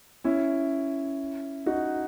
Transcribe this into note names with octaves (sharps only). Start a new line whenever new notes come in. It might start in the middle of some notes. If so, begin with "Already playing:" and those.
C#4 E4
D#4 F#4